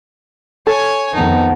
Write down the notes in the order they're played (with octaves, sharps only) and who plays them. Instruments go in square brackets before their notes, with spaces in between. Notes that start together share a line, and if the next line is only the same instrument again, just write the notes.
[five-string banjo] A4 [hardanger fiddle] C#5 G#5
[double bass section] F2 D#3 B3 [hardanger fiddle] D#4 [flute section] F#5 A5